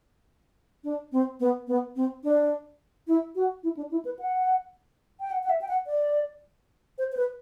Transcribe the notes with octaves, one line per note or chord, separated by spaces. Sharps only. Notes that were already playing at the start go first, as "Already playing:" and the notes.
D4
C4
B3
B3
C4
D4
E4
F#4
E4
D4
E4
B4
F#5
G5
F#5
F#5
E5
G5
F#5
D5
C5
C5
B4